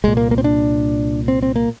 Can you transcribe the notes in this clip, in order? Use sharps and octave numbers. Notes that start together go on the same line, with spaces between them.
C2 A#2 G#3
A#3
A#3
C4
D4
C4
C4
A#3